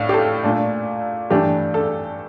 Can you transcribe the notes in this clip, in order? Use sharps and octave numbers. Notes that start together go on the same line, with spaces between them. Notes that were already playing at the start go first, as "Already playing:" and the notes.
Already playing: A2 D4 F5
G4
A4
A#2 A3 D4
G2 E3 A3 D4 G4
A4